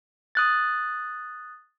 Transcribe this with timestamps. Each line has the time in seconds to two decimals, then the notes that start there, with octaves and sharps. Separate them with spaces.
0.35 D#6 F#6 A6